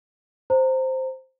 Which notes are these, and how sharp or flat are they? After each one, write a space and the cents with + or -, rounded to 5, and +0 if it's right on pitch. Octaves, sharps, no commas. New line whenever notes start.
C5 +0 A#5 -25